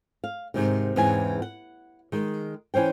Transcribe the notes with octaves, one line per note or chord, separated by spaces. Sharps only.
F5
G#2 C3 D#3
E2 G#2 C#3 E3 C4 G#5
F#5
D#3 G#3
E3 C#4 C5 G5